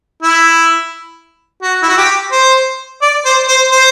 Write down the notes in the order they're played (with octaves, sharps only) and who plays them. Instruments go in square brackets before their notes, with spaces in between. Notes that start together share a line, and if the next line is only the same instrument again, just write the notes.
[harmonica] E4
F#4
E4
F#4
G4
C5
D5
C5
C5
C5